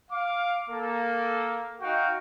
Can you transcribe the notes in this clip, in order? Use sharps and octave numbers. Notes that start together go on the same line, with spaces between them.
F5 D6
A#3 A4
D#4 F#4 F5 G5